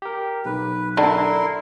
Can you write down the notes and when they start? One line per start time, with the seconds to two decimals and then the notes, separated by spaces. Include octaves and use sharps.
0.02 G4 A#4
0.45 B1 B4
0.97 D3 D4 E4 A#4 C6